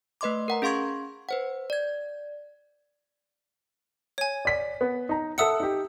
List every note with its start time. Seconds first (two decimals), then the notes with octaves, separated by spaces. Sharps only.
0.21 A3 B4 D#5 C6 D6
0.48 A#4 F#5 A#5
0.62 C#4 G#4 F5 C6 C#6 G#6
1.29 B4 C5 F#5
1.70 D5 G#6
4.18 C#5 G#5
4.45 D5 B6
4.81 B3
5.09 D#4 A#5
5.38 A4 E5 F#5 D#6 E6 C#7
5.60 D#4 G4